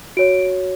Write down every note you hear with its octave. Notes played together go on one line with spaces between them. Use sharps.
F#4 C#5 D7